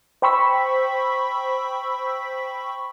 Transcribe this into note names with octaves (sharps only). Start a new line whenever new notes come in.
C5 G5 B5 C#6 E6 B6